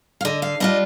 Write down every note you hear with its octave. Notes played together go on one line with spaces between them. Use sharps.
F5
D3 D#5
F5
G3 D4 F4 D#5